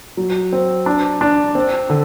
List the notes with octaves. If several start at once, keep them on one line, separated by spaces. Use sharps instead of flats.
F#3
C4
D4
D4
C4
D3